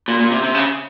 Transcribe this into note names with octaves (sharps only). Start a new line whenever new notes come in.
A#2
A#2
C3
C3
C#3